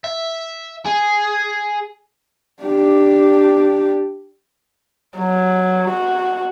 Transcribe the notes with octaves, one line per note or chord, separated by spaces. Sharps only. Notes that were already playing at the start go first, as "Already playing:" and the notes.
E5
G#4
D4 G4
F#3
F#4